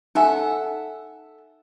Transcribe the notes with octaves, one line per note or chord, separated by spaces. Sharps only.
D#4 A4 E5 F#5 G#5